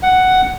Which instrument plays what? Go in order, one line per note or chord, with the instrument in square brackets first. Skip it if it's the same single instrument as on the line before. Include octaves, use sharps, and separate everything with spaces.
[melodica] F#5